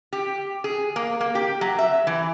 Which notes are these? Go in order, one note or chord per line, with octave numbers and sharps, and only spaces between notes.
G4
G#4
A#3
A#3
G4
F#3
E5
E3